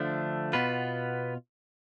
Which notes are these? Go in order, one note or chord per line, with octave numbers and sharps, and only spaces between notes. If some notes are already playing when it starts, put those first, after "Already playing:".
Already playing: D3 F3 A3 D4
B2 B3 F4 B4